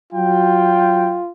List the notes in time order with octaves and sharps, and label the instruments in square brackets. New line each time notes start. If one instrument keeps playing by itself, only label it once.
[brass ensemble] F#3 G5 [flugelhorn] F4